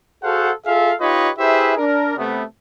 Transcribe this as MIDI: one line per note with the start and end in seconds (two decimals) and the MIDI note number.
0.23 0.51 66
0.23 0.51 68
0.23 0.51 69
0.23 0.51 72
0.23 0.51 77
0.23 0.51 78
0.66 0.92 65
0.66 0.92 68
0.66 0.92 69
0.66 0.92 76
0.66 0.92 77
1.01 1.30 63
1.01 1.30 65
1.01 1.30 67
1.01 1.30 71
1.01 1.30 73
1.01 1.30 75
1.38 1.75 64
1.38 1.75 67
1.38 1.75 68
1.38 1.75 71
1.38 1.75 72
1.38 1.75 76
1.77 2.16 62
1.77 2.16 70
2.18 2.43 48
2.18 2.43 57
2.18 2.43 59